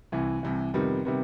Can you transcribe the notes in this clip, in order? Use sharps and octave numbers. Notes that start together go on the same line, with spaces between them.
C2 C3 E3
C2 C3 E3
F2 C3 D#3 G3 B3
C3 D#3 G3 B3